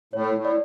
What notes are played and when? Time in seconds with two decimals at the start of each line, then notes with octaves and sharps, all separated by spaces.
0.13 A2 C#5
0.35 A2
0.45 D5